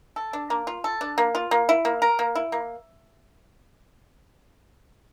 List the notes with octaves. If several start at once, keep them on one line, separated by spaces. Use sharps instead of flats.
A4
D4
A#3
F4
A4
D4
A#3
F4
A#3
E4
A#3
A#4
A#3
E4
A#3